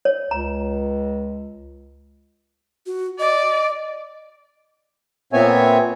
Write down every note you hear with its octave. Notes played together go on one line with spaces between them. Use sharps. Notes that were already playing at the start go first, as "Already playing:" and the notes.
C#5
C#2 A#5
F#4
D5 D#5
A#2 B3 C4 C#5 E5 G#5